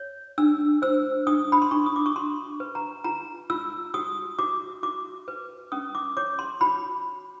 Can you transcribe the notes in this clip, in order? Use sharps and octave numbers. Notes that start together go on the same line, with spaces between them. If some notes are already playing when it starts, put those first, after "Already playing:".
Already playing: C#5
D4 E6
C5 E6
D4 D#6
B5
C6
D4 C#6
D#6
D6
C#6
F#4 C6
B4
A#5
F4 A#5
F4 E6
F#4 D#6
F#4 D6
F#4 D6
B4
C#4 D#6
D6
C#5 D6
C6
F#4 B5